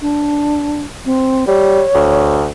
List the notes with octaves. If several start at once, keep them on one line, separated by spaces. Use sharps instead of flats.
D4
C4
G3 C#5
D2